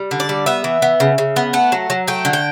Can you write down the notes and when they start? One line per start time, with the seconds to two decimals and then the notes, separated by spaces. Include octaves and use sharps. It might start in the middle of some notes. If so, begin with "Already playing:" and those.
Already playing: G3
0.11 D3
0.20 D5
0.29 G3
0.46 B3 E5
0.64 E3
0.82 B3
1.00 C#3
1.18 C#3
1.36 B3
1.53 A3 F#5
1.72 F#3
1.90 F#3
2.07 A3 G5
2.25 D3
2.33 G5